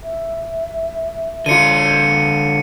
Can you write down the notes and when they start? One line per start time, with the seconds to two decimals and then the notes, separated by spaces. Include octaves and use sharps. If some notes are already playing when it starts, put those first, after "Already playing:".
0.04 E5
1.46 D3 F4 C#7 D#7